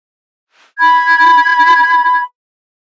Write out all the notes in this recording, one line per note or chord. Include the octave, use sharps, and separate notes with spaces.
B5 G#6